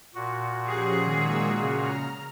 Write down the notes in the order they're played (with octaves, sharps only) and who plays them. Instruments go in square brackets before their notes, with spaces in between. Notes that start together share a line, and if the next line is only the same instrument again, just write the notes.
[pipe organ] A#2 F#4
[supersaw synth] F3 C#4 [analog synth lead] G4 [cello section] G#4
[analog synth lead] D#3 [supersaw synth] G#3 A#3 E6
[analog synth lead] C#3 [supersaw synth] A#5 F6